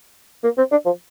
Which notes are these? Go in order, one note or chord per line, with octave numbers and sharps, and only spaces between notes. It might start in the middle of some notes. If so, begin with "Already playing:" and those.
A#3
C4
D4
F3